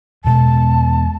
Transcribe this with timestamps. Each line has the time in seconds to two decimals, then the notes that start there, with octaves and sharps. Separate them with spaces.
0.24 E2 B2 G#3 A5